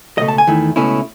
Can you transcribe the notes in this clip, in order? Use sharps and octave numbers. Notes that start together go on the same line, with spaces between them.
C#2 B2 A3 D#5
A5
G#5
E2 D#3 A3 E4
C#2 B2 A3 C#4 E4